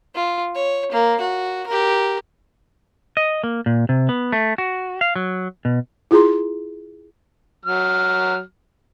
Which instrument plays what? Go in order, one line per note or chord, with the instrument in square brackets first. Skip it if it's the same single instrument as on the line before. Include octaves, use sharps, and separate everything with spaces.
[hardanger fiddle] F4
C#5
A#3
F#4
G4 A#4
[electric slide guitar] D#5
A#3
A#2
C3
B3
A3
F#4
F5
F#3
B2
[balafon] E4 F4 G#4 A#5 C6
[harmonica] F#3 F6